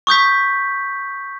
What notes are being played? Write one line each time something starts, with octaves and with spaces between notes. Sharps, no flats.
C#6 D#6 G6 B6